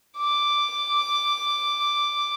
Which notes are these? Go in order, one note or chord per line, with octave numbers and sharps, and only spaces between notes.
D6